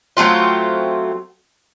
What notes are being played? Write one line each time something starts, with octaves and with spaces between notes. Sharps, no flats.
F#3 A3 C4 F4